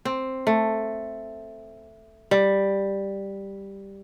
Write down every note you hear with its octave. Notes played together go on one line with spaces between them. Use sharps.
C4
A3
G3